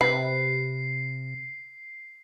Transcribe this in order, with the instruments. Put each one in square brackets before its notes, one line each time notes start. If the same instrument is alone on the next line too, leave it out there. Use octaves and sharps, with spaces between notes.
[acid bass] C3 [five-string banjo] B4 [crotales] C7